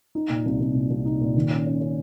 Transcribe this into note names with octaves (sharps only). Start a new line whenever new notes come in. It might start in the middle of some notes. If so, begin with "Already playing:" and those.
D#4
A#2
C2
C2
A#2
C2
D#4
A#2
D#3
C#4
C#4
C#4